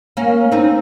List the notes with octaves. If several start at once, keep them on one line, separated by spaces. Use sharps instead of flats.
A#3 C#4
C4 D#4